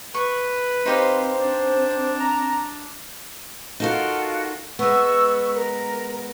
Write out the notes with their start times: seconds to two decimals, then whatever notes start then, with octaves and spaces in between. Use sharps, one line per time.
0.14 B4 C#6
0.86 C4 D#4 G4 C5 F5
1.38 D4
2.20 A#5
3.80 D#4 F4 F#4 A4 A#4
4.79 G#3 B3 C#6 E6
5.54 A#4